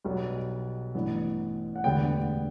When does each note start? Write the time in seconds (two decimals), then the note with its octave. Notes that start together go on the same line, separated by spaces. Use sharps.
0.04 B1 B2 G3 B3
0.95 A1 G2 E3 B3
1.76 F#5
1.84 E1 D2 D3 G3 B3 G5